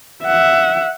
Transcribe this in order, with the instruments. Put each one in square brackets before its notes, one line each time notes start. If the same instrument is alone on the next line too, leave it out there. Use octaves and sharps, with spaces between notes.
[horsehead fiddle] E5 F#5